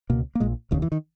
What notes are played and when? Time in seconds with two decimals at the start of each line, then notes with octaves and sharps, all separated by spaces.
0.10 C#2 B2 A#3
0.35 A#3
0.40 A#1 A#2 G#3
0.71 E1 D#2 C#3 E3
0.82 E3
0.92 D#3